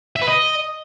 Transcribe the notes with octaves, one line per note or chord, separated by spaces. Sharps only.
E5
B4
D#5